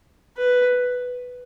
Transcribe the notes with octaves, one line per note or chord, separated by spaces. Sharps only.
B4